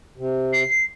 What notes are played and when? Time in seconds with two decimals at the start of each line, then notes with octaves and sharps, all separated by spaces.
0.18 C3
0.53 C7